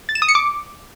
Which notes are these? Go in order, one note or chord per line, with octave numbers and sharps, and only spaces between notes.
A6
E7
D#6
C#7
D6